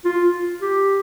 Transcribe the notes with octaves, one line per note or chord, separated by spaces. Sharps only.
F4
G4